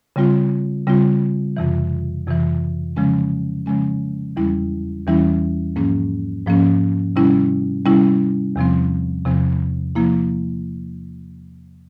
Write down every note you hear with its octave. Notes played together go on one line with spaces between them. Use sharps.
C#3 G3 C4 F4
C#3 G3 C4 F4
F2 C3 E3
F2 C3 E3
C#3 F3 G#3 C#4
C#3 F3 G#3 C#4
E2 E3 G3 C#4 E4
E2 E3 G3 C#4 E4
G#2 F3 A#3 C#4
G#2 F3 A#3 C#4
C3 G3 C#4 E4
C3 G3 C#4 E4
E2 C3 F3 C4
E2 C3 F3 C4
C3 F3 A#3 E4